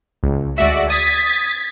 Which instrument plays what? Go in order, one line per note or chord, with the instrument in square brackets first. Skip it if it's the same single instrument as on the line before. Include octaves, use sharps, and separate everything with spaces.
[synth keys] C#2
[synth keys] D2 G#3 E5 [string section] F#4 D5
[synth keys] D#6 [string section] G#6 A6 B6